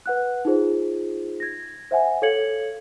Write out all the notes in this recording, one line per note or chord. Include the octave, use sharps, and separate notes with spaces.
B4 F#5 F#6
D#4 F4 G#4 C5
G#6 A#6
C5 E5 F#5 G#5
A4 C#5 F5 G#6 C#7 F#7